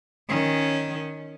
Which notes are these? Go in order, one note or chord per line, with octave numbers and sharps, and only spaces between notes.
D#3 C#4